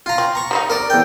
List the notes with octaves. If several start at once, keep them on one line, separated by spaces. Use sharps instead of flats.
F4 A#5
C4
A#5 C#6
G3 A#3 D#4
A#4 D5
E2 G5